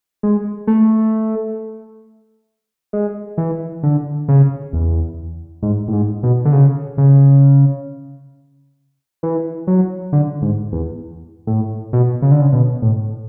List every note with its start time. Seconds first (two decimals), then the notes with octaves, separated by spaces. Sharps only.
0.23 G#3
0.67 A3
2.93 G#3
3.38 E3
3.83 D3
4.28 C#3
4.73 E2
5.63 G#2
5.88 A2
5.93 G#2
6.23 B2
6.45 D3
6.52 C#3
6.98 C#3
9.23 E3
9.67 F#3
10.13 D3
10.42 G#2
10.72 E2
11.47 A2
11.93 B2
12.22 C#3
12.31 D3
12.41 C#3
12.53 B2
12.82 A2